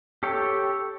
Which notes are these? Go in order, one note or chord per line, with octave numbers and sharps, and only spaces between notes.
G4 A4 C#5 G5